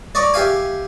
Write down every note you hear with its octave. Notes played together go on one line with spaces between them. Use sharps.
D5 D#5 C#6 D6
G4 E5 F5 G#5